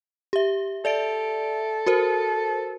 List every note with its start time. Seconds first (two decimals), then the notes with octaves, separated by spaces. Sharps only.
0.33 G4 E5
0.85 A4 D5 E5 D7
1.87 F#4 A#4 C5